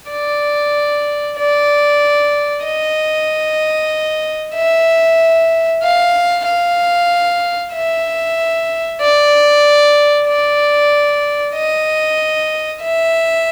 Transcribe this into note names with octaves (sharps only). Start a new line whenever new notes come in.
D5
D5
D#5
E5
F5
F5
E5
D5
D5
D#5
E5